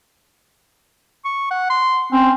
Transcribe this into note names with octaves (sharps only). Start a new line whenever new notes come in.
C#6
F#5
C6
C4 C#4